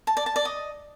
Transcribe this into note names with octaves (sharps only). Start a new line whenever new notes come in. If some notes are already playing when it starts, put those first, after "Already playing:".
A5
D5
A5
D5
D#5